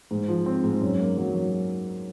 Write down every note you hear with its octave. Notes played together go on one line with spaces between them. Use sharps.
G#2
F3
C4
G#2
F#2
A#3
F#3
F#3